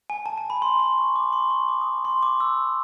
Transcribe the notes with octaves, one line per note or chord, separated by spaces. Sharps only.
G#5
A5
A5
B5
C6
C6
C#6
D6
C6
C#6
D6
D#6
C6
D6
E6